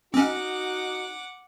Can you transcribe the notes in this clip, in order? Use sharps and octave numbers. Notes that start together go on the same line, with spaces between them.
C4 C#4 D#4 F#4 F#5 D6